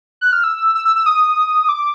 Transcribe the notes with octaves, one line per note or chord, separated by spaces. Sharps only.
F#6
F6
E6
E6
E6
E6
D#6
D6